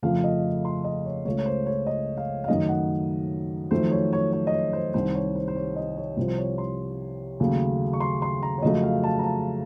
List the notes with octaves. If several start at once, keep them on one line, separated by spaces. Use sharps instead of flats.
F2 C#3 F3 A3 F5
D#5
C6
D#5
C#5
C#2 C#3 A3 C#5
C#5
C5
C#5
D#5
F5
F5
F#2 D#3 A3 D#5
F#5
F2 D#3 F#3 A3 C5
C#5
C#5
C#5
D#5
C#5
C5
C2 C3 D#3 C5
C#5
C5
C5
C#5
D#5
C#5
C2 C3 F3 C5
C5
C#5
C6
D#2 C#3 F#3 A3
C#6
C6
C6
A#5
C#5
F2 C#3 F#3 A3 D#5
F5
A5
A#5
A5